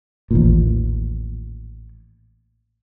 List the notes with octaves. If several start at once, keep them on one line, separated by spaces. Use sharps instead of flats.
A1 D#2 A#2